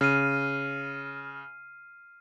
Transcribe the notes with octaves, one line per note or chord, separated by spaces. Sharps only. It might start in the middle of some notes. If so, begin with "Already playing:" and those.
C#3 F6 C7 D#7